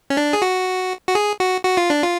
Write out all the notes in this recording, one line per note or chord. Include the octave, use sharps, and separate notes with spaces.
C#4
D4
G#4
F#4
F#4
G#4
F#4
F#4
F4
D4
F4